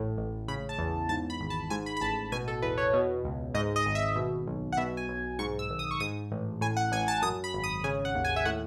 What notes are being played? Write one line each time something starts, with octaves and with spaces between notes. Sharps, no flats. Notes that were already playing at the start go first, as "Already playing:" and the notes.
Already playing: A1 A2
A1
C#3 B5
A5
E2
G#2 A5
B5
G#1
A5
G#2 G#5
B5
B5
A1 A5
B2 G#5
A4
E2 B4
C#5
B2
C#2
G#2 D#5
D#5
G#1
E5
B2
B1
F#5
B2 E5
G#5
B1
G#2 C#6
E6
G#1
D#6
C#6
G#2 D#6
A1
A2 G#5
F#5
A1 G#5
A5
F#2 D#6
B5
G#1
D#6
C#3 G#5
F#5
D#2
G#5
E5
A2 F#5